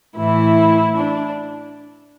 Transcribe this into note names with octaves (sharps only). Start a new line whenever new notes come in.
A2 E3 E4
D4